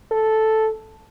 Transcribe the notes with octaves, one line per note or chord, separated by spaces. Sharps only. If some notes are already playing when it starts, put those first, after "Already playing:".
A4